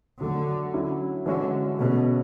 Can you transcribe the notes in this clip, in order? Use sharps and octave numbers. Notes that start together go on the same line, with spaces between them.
D3 F#3 A3 D4 A4
D3 F#3 C#4 E4
D3 E3 G#3 C#4 F#4 C#5
B2 A3 C#4 G#4